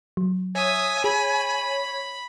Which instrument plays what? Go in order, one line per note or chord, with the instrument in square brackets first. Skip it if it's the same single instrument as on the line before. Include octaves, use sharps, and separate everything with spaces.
[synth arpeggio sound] F#3
[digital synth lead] C#5 [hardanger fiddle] E5 D#6 [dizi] G#5
[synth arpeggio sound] G#4 [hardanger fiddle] B5